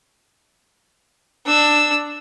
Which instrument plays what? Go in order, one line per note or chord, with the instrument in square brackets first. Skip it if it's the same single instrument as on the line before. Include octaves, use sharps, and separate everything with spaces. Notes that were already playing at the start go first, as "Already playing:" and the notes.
[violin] D4 E6